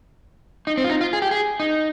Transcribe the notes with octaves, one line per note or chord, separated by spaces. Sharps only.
D#4
C4
F4
D#4
F4
G#4
G4
G#4
D#4